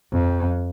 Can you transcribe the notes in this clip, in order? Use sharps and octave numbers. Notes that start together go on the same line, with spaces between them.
F2